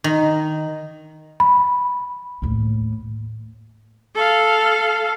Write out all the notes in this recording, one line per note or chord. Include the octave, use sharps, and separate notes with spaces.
D#3
B5
D#2 A2
A4 F5